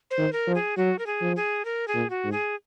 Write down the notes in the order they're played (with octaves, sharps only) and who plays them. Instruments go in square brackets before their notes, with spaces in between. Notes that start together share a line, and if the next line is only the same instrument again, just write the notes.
[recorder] C5
[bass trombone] D#3
[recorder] A#4
[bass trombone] F3
[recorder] G#4
[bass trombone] F#3 [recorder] F#4
[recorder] A#4
G#4
[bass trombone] F3
[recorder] G#4
A#4
G#4
[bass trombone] A#2
[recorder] F#4
[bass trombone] G#2
[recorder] G#4